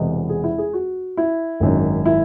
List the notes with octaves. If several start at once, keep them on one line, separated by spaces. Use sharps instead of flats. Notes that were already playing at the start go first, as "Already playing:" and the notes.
Already playing: E1 E2 C3 E3 D#5
G#4
E4
G#4
F#4
E4
G#1 F#2 D#3 F#3
E4